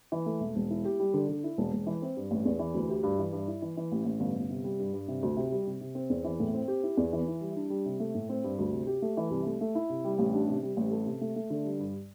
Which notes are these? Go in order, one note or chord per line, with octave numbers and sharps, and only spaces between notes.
E3
A3
E1
E1
E4
G4
G3
D3
D3
E4
E1
E1
E3
C4
G2
A1
E2
E3
D2
G4
G2
E3
G2
E4
E3
E3
A1
A1
G1
G1
C3
G3
G2
G2
C3
D2
C3
G3
C3
C3
C4
E2
E3
A2
C4
G4
E4
E2
E3
E4
G3
D4
G3
C3
A3
A2
C4
G2
D2
C3
G4
A3
E3
C2
A3
A3
E4
C3
G3
A1
D4
C3
G3
A1
A4
C3
A3
A3
D3
G3
G2